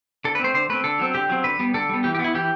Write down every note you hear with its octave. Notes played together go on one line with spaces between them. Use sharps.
D3 A4
B4
A3 C4 C5
D3 C5
A3 C4 B4
D3 A4
F#3 C4
D3 G4
F#3 C4
D3 B4
G3 B3
D3 A4
G3 B3
E3 G4
G4
B3
E4
E3 G4